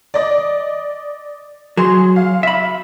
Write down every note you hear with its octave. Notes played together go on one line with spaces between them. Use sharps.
D5 D#5
F#3 G#4 C6
F5
E5 B5